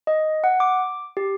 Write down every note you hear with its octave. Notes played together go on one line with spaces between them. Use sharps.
D#5
F#5
D6
G4